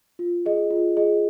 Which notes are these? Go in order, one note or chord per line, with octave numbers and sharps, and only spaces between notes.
F4
G#4 D#5
F4
G#4 D#5